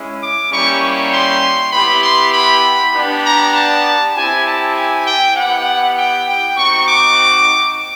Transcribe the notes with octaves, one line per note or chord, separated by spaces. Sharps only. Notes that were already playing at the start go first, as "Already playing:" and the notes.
Already playing: G#3 C#4 E4
D6
G3 A#3 C#4 E4 G4 C#6
C6
B3 E4 G4 B5
C6
B5
B3 D4 G4
A#5
A5
C4 E4 G4 G#5
A5
G#5
G5
B3 E4 G4 F#5
G5
G5
C4 D#4 F#4 C#6
D6